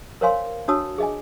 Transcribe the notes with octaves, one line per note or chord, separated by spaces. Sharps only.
A#4 C5 C#5 F5 G#5 C6
D4 F#4 C#5 A5 D#6 E6
G#4 D#5 G#5